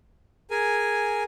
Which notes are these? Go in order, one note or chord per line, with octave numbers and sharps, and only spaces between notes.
G#4 A#4 G#5